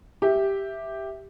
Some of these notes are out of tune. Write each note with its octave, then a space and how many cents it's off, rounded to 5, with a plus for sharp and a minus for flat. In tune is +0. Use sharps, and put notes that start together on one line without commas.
G4 +0 E5 +0